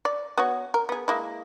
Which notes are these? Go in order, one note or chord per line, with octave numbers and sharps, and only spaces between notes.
D5
B3 F#4 C#5
A#4
B3 G#4
G#3 A#3 E4